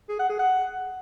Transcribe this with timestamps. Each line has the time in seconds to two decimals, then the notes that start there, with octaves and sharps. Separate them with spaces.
0.09 G#4
0.19 F#5
0.29 G#4
0.39 F#5